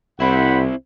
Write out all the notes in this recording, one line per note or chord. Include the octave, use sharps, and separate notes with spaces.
C2 C4 E4 C5 F#5 B5